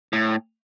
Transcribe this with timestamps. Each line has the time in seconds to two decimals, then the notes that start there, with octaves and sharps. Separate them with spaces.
0.13 A2